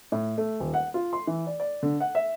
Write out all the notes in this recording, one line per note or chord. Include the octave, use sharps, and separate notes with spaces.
A2
A3
D#1
F#5
F4
C6
E3
D5
D5
D3
F#5
E5